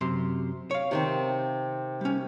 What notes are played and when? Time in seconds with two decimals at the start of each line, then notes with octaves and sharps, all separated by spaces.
0.01 F#2 C3 C6
0.71 C#5 F5
0.91 C3 D#3 C4
2.01 G3 C#4